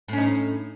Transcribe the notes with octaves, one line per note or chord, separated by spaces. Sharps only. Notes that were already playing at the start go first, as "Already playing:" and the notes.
A2 C#4 D#4